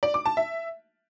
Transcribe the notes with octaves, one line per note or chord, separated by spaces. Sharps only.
D5
D6
A5
E5